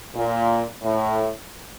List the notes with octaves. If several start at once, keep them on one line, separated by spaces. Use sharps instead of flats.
A#2
A2